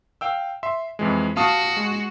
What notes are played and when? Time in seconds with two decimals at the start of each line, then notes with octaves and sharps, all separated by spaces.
0.21 F5 G5 E6
0.63 E5 C6
0.99 F2 E3 G#3
1.37 F#4 F5 A5 D#6
1.77 G#3